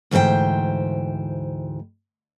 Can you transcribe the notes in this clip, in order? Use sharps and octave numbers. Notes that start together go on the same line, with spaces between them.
D2 G#2 E3 C5 G5